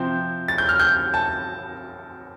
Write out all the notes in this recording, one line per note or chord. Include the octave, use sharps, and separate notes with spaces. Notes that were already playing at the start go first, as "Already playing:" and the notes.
Already playing: C3 F3 C4 G6
A6
G6
F6
G6
A5